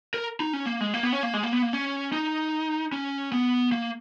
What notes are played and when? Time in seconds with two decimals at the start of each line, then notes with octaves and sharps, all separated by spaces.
0.14 A#4
0.40 D#4
0.53 C#4
0.66 A#3
0.80 G#3
0.94 A#3
1.03 B3
1.13 C#4
1.23 A#3
1.34 G#3
1.43 A#3
1.52 B3
1.62 A#3
1.73 C#4
2.13 D#4
2.92 C#4
3.32 B3
3.72 A#3